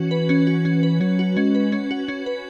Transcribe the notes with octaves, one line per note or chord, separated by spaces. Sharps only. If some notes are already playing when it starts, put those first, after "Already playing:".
Already playing: E3 C#4 F#4
B4
C#4
F#4
C#4
B4
F#3 C#4
F#4
G#3 C#4
B4
C#4
F#4
C#4
B4